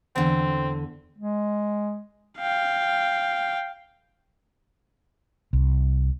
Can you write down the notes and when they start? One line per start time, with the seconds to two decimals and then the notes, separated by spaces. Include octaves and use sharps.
0.16 E2 D3 C4
1.18 G#3
2.38 F5 G5
5.53 C2